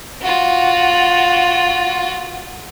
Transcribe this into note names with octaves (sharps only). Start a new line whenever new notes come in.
F4 F#4